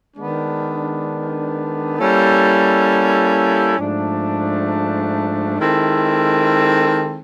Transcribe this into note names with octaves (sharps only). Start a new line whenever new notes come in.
D#3 G#3 B3 D4
G3 A#3 C#4 E4 A4
G#2 F3 A3 D4
D#3 G#3 C4 E4 A4